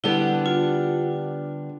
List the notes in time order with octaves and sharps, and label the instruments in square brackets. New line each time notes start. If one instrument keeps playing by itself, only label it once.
[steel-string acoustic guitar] D3 G3 B3 D4 G4 [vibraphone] E4
[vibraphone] F4